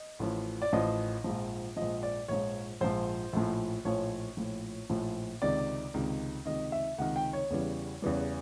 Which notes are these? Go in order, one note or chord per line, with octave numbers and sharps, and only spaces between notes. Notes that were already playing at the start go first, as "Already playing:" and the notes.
Already playing: D#5
A1 A2 F3
D5
A1 A2 F3 D#5
A#1 G#2 F3
A#1 G#2 F3 D#5
D5
A#1 G#2 F3 C#5
A#1 G#2 F3 C5
A#1 A2 F3
A#1 A2 F3 C#5
A#1 A2 F3
A#1 A2 F3
C#2 C3 D#3 D5
C#2 C3 D#3
C#2 C3 D#3 D#5
E5
C#2 C3 D#3 F#5
G5
C#5
E2 C#3 E3 G3
E2 C#3 E3 G3